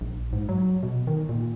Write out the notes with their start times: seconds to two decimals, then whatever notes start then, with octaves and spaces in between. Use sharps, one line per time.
0.01 A#1
0.33 G#2
0.49 F#3
0.83 B2
1.07 D#3
1.29 A#2